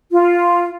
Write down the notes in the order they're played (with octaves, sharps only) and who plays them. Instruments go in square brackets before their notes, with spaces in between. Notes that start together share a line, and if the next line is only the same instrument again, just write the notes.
[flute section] F4